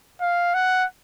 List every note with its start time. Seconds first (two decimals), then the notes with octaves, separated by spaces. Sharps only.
0.21 F5
0.54 F#5